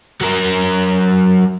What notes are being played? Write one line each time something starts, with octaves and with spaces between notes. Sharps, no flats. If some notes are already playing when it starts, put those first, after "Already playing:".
F#3 A#4